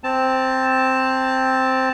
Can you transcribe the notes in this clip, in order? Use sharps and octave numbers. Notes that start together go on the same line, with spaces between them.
C4 A5